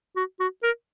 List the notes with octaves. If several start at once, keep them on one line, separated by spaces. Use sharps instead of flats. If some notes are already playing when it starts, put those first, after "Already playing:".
F#4
F#4
A#4